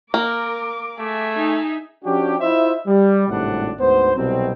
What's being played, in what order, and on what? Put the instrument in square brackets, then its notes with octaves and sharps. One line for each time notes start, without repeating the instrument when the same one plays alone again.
[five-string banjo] A#3 [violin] A#4 [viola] D6
[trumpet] A3 [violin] G#4 E5
[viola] D#4
[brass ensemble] F3 C#4 D4 F#4 G4
E4 F4 C5 D#5 E5
G3
G#1 A2 C3 G3 D4 F#5
D2 G#2 B3 C5
C2 B2 F#3 C4